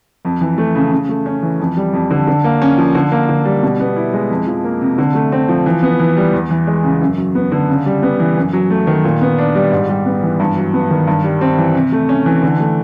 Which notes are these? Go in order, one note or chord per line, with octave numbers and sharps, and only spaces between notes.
F2
E3
A3
C#3
C#3
A3
C#4
E3
F2
G3
F2
D3
D3
A#3
C#4
F3
D3
A#3
D3
G3
B2
B3
E4
G#3
F2
F3
A#3
C3
D3
A3
C4
F3
E3
B3
E3
G3
E2
E3
G#3
C#3
F#2
F#3
B3
D3
C#3
G3
B3
E3
F#2
F#3
A3
D#3
A#2
B3
D4
G3
G#2
G3
B3
E3
G2
F#3
B3
D#3
G2
G3
C4
E3
C3
A3
C#4
E3
D3
A3